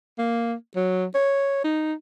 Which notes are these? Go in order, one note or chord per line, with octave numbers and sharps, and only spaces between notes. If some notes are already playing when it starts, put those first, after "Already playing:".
A#3
F#3
C#5
D#4